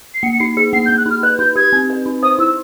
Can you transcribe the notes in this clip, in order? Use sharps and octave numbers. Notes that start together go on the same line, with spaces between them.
C7
A#3 C#7
C#7
D#4 C7
G#4 C#7
A#3 C7
G6
A#3
F#6
D#4 F6
B4 F#6
D#4 G6
G4 G#6
C4
B4
D#4
C5 D#6
E4 E6